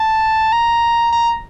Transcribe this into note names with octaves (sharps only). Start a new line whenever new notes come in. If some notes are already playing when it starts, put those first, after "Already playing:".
Already playing: A5
A#5
A#5